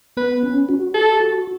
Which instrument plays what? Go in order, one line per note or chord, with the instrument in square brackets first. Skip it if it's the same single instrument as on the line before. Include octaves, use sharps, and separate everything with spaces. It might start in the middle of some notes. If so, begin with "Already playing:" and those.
[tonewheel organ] B3 [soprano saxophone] B4
[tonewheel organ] C#4
F#4
[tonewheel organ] G4 [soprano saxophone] A4
[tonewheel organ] F#4